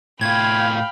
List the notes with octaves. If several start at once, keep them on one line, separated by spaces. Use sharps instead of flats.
A2 F4 F5 G5 B5 G#6